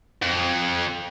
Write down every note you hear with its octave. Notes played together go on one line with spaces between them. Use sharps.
F2